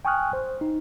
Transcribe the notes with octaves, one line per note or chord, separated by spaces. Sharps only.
G5 G#5 C#6 D#6 F6 F#6
C5
D#4